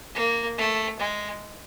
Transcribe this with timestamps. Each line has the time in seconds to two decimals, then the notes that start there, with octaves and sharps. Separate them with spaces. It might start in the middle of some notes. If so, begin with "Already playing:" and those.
0.15 A#3
0.58 A3
0.99 G#3